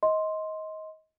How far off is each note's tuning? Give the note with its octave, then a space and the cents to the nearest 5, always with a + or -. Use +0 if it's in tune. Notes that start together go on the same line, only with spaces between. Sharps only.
D#5 +20 C6 +0